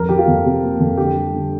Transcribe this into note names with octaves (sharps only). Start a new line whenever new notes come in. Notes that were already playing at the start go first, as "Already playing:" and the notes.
Already playing: F2 A#4
F3 G4
F4
F2
C3
A#3
F2
D3 G4
G3
D3